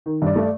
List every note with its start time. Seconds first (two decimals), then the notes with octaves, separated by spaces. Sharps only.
0.06 D#3
0.22 G2 D5
0.36 A3